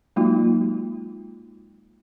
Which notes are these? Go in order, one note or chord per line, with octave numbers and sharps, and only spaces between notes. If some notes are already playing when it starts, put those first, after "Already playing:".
F#3 G#3 A#3 D#4 F4 F#4